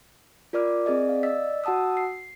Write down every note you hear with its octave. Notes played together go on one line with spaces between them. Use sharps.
F4 A#4 D5 D6 F6
C4 G#4 D5 D#5
F5
D5 D#5 E6 B6
F#4 F#5 A5 D#6 E6
C7